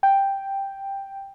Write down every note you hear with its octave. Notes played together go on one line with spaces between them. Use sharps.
G5